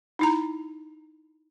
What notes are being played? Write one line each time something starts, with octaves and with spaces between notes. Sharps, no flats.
D#4 E4 A#5